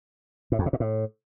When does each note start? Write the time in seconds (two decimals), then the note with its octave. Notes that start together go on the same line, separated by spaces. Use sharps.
0.52 A2
0.59 F2
0.66 C3
0.73 A#2
0.80 A2